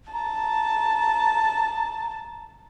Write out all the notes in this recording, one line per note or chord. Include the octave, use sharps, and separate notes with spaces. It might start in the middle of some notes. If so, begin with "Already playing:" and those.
A5 A#5